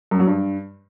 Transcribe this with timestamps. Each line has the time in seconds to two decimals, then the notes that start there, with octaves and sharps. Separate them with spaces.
0.11 F#2
0.19 F#3
0.27 G2